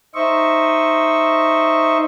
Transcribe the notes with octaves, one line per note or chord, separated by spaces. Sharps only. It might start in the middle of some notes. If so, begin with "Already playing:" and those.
D#4 C5 D#5 E5 C#6